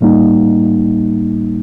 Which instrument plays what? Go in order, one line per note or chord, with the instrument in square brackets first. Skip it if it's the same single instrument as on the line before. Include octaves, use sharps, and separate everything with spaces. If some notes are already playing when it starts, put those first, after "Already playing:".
[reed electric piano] A2 G3 A#3 D#4